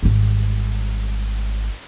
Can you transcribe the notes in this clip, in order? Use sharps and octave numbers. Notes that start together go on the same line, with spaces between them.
G#1 G3